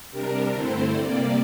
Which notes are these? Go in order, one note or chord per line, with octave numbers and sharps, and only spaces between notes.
C3 G3 D4 A#4
G2 D3 A3 C4 E4 C5
C3 G3 A#3 D5